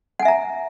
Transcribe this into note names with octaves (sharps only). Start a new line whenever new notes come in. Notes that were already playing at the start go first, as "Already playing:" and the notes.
E5 F#5 G#5 A#5